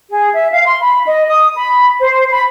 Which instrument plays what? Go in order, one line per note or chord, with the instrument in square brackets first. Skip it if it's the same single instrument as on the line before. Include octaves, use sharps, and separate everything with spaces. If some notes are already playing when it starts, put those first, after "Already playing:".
[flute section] G#4
E5
F5
C6
B5
D#5
D#6
B5
C5
B5